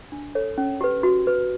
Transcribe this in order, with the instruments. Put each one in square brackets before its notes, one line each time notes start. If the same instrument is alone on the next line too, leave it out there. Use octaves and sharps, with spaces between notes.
[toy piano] D4
A4 C#5
C#4
G4 B4
F#4
B4